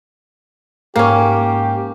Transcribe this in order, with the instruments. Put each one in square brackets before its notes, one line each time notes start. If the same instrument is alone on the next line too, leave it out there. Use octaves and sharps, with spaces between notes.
[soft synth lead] G#2 [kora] A#3 C#4 [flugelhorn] G4